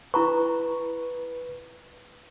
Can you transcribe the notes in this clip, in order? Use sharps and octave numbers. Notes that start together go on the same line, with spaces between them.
E4 B4 A#5 C#6